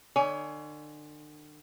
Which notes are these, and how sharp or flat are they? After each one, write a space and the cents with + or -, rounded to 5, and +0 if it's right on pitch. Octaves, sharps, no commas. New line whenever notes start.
D3 +40 C#5 +30 G#5 +0